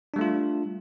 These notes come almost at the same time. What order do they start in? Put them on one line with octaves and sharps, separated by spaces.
D4 G3 A3 F4